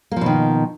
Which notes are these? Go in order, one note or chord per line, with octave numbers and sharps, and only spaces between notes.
B2 D#3 F3 A#3